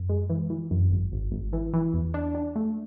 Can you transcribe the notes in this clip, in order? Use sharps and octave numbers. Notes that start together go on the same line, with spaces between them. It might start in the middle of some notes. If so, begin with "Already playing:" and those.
Already playing: F#2
G#3
E3
E3
F#2
G#1
G#1
G#1
E3
E3
E2
D4
D4
A3